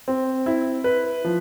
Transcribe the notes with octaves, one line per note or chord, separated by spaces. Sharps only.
C4
E4
B4
F3